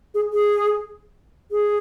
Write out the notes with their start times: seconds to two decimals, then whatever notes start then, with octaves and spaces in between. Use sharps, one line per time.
0.14 G#4
0.33 G#4
1.51 G#4